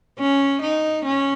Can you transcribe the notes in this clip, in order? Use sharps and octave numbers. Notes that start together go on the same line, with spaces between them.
C#4
D#4
C#4